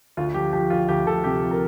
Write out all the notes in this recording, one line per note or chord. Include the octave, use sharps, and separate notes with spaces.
D2 F4
F3 G4
F3 G4
D2 F4
D2 G4
D2 A4
C3 G4
F3
A#4